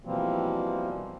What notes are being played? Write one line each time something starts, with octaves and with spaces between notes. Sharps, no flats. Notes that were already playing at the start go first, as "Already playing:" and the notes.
B2 E3 F3 G3 A#3 C4